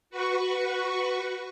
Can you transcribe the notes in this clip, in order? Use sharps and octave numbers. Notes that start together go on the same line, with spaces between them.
F#4 B4 C#6